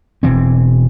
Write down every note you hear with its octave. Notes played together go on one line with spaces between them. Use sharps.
E1 B2 E3 C4